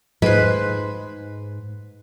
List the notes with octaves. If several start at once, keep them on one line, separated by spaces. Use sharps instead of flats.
G#2 G#3 B4 C5